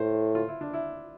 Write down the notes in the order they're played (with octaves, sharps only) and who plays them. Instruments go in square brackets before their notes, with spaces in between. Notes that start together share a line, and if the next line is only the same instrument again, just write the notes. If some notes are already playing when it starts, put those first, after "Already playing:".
Already playing: [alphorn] A2 [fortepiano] C5
[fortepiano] F4
E4
D4
E4